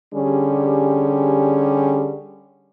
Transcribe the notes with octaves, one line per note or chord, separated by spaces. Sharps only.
D3 G3 C#4 G4 G#4